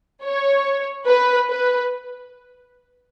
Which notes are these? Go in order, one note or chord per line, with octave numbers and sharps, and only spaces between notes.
C#5
B4
B4